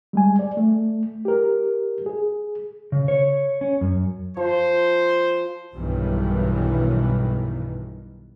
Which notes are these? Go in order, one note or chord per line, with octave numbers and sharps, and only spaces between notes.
G3 G#3 G#5
D5
A3
G4 A#4
G#4
C#3
C#5
C#4
F#2
F3 C5
B1 G2 D#3 E3